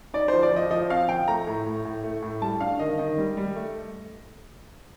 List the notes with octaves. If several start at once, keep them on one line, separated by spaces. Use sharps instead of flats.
D#4 D5
F3 C5
D5
F3 D#5
F3 D#5
C4 F5
F3 G5
A3 A#5
A2
A2
A2
A3
A2
G3 A5
D4 F5
D#3 D#5
D#3 D#5
G3
G3
A3